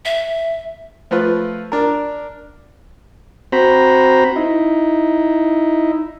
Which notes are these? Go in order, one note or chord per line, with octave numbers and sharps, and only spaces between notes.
E5
F3 A3 F4 B4
D4 A#4
C4 F#4 C5 A#5 B5
D#4 E4